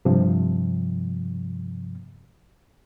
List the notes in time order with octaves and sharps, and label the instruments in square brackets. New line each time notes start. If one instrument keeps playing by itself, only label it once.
[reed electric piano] G2 C3 F3